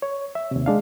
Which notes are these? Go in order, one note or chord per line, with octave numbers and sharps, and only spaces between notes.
C#5
E5
D#2 C3
G#3 D4 F5